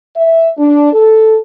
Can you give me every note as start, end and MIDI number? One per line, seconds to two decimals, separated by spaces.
0.15 0.47 76
0.56 0.90 62
0.92 1.36 69